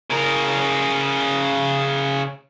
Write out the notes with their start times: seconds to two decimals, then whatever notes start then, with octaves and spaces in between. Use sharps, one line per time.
0.11 C#3 A#4